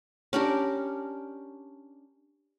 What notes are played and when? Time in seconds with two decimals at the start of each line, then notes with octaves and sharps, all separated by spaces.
0.33 C#4 D4 G4 A#4